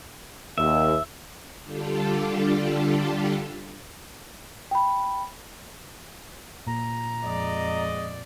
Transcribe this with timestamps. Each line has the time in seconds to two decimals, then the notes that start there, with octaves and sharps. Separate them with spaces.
0.58 D#2 E5
1.63 D3 G3 D4 F4 G4 A4
4.71 G5 B5
6.67 A#2 A#5
7.24 F2 F3 G#3 D5 D#5